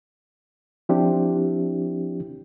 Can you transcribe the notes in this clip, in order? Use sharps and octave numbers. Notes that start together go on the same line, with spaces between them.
F3 C4 D4 E4 G4